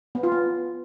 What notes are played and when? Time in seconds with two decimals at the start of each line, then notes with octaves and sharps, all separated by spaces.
0.15 B3
0.23 F4
0.32 B3